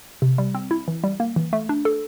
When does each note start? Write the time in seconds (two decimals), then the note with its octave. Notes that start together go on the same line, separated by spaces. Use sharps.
0.22 C3
0.38 G3
0.55 C4
0.71 E4
0.88 E3
1.04 G3
1.20 A#3
1.36 E3
1.53 A3
1.69 D4
1.85 A4